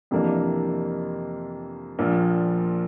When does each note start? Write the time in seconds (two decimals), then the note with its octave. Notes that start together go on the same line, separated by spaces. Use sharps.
0.11 F2 C3 E3 A#3 D4
1.99 A#1 A#2 F3